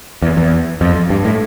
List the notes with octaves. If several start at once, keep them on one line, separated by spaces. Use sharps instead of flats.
E2
E2
F2
G2
A2